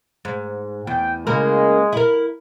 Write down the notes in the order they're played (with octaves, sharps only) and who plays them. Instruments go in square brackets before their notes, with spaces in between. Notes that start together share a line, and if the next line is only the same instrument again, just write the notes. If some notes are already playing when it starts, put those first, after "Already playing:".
[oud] G#2
[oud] E2 [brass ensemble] G5
[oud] C#3 A#3 A#4 [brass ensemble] G#3
[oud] E4 A#4